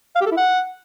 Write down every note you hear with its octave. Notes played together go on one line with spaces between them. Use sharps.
F5
G4
A4
E4
F#5